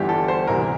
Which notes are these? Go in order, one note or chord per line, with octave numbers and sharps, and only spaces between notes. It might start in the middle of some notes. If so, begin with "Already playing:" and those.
Already playing: G1 G2 E3 G4
A4
C5
D2 C3 E3 A#4